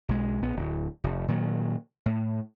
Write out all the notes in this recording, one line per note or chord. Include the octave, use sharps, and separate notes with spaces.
B1 G#3
A#1 B3
D1
F1
A#2 D#3 F#3
A2